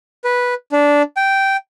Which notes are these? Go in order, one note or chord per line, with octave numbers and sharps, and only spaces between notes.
B4
D4
G5